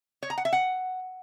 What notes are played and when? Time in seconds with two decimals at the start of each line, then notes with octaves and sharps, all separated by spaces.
0.23 C#5
0.30 A#5
0.38 F#5
0.45 E5
0.53 F#5